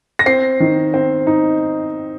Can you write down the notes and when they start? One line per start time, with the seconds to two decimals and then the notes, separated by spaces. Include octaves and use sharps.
0.19 A#6
0.26 C4 C7
0.60 D#3
0.94 C4
1.27 D#4